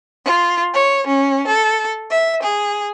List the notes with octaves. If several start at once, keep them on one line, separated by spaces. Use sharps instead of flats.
F4
C#5
C#4
A4
E5
G#4